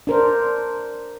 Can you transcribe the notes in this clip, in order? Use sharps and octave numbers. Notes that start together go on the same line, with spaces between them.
D4 A#4 C5